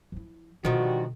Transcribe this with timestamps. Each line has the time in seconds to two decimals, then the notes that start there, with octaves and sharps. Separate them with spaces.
0.12 F3 E4
0.65 G2 B2 D3 D#3 F3 G3 F#4